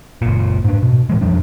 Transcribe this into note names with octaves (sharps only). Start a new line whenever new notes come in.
F#1 A#2
G#2 D4
B2
A2 E3 G#3
F2 F3 G3 D4